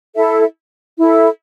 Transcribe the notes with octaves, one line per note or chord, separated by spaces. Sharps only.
E4 A4 E5
E4 A4 E5